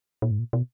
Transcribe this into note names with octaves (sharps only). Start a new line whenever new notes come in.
A#2
G#2
A#2
B2